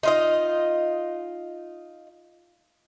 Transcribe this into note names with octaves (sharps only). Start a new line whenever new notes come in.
D#4 F4 D#5